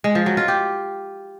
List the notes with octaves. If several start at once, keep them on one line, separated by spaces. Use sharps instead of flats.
G#3
F3
F#3
F4
G4